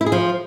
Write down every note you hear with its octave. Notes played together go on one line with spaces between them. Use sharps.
E4
G#4
F3